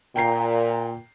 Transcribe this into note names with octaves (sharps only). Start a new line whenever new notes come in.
A#2 G5 A#5 C7